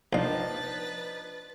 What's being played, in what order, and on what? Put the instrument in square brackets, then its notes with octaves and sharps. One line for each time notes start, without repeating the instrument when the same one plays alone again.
[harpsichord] A#1 F5 [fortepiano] F3 D4 D#4 [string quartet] B4 A6